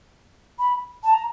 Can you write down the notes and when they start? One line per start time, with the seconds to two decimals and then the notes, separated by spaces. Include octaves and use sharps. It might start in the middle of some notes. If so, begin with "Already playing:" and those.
0.59 B5
1.04 A5
1.13 A#5